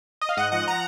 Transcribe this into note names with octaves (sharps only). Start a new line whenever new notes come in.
D#5
F5
G#2 D#5 F#5
F3 D#5 F#5
F#5 A#5